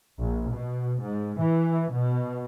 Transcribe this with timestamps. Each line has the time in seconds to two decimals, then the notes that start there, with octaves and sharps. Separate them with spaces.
0.19 A#1
0.51 B2
1.01 G#2
1.40 E3
1.91 B2